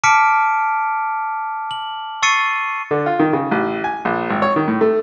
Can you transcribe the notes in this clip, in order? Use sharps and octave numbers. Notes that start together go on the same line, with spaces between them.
A5 D6 F6 B6 C#7 D7
F#7
C#6 E6 A6 C7 C#7 D#7
D3
F4
D#3
C#3
A1
G#5
A#1
G#1
C#5
D#3
A2
A3